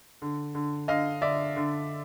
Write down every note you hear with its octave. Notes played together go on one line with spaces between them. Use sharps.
D3
D3
D3 D#5 F5
D3 D5 E5
D3